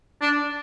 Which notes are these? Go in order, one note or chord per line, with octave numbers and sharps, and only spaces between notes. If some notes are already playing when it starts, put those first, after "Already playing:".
D4